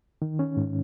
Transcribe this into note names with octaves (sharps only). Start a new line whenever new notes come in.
D#3
C#4
G#2